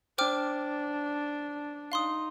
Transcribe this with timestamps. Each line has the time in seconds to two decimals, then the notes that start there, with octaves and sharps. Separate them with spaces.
0.18 D4 C5 G5 D6 F6
1.92 D#4 F5 C6 D#6